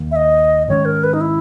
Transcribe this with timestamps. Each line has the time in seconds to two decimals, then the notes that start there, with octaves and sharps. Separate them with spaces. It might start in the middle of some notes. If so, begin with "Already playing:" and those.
Already playing: D#2 D#3 A#3
0.11 E5
0.16 D#5
0.68 G#2 D#3 G#3 C#4 C#5
0.85 A#4
1.04 B4
1.13 D#4
1.21 E4